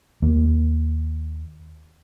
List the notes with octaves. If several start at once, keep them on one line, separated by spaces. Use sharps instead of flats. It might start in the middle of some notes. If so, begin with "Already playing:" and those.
D#2 A#3